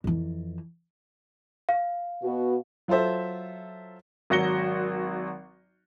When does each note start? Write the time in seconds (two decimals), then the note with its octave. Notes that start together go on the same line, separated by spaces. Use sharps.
0.04 F2 E3
1.69 F5
2.23 B2 F#4
2.88 F#3 F4 A4 C5 E5
4.30 G#1 F#3 F#4 A#6 C#7 G7